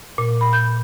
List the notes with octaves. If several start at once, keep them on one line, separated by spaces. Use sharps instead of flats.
A#2
B5
G6